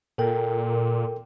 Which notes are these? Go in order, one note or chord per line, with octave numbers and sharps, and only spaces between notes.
A#2 A4 A#4 G5